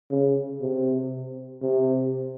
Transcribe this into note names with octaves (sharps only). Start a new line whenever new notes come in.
C#3
C3
C3